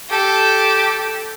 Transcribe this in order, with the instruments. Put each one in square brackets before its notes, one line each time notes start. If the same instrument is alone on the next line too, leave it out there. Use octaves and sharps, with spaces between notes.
[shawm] G4 [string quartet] A4